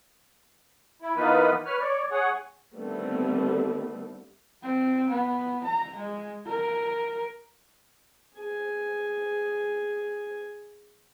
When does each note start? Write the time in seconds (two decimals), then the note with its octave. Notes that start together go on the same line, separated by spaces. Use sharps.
1.02 E4
1.16 E3 A#3 B3 D#4 F4 B4
1.65 B4 C#5 F6
1.81 C#5 D5
2.11 G#4 C#5 F#5
2.74 D3 D#3 G3 A3 B3 C4
4.62 C4
5.10 B3
5.64 A#5
5.96 G#3
6.46 A#4
8.36 G#4 G#5